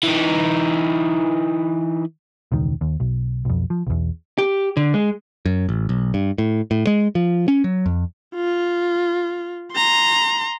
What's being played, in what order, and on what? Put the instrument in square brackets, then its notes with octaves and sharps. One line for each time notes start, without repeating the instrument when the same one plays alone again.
[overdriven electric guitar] E3 D#4
[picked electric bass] E1 C#2 D#3
D#2
B1
B1 F2
F3
B1 E2
[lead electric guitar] G4
D3
G#3
[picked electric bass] F#2
A1
B1
G2
A2
A2
G#3
F3
C#4
F#3
F2
[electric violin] F4
A#5 C6